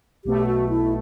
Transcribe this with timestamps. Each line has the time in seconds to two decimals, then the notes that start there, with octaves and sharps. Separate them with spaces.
0.25 B1 B2 A3 G4
0.47 F#4
0.69 E4